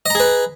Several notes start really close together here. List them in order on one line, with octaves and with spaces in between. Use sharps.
D#5 A#5 G#4 B4